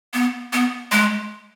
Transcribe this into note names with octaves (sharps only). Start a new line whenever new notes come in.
B3
B3
G#3